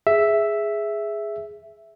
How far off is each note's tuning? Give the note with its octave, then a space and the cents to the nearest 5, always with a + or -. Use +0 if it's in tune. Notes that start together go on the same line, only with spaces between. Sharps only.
G#4 +0 E5 +0